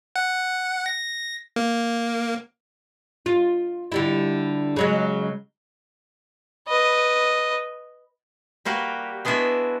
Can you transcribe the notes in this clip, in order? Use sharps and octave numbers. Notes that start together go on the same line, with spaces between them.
F#5
A#6
A#3
F4
D3 G3 E4
C#3 F#3 G#3
B4 D#5
G3 A#3 F#4 G4
G#3 B3 D4 E4 F#4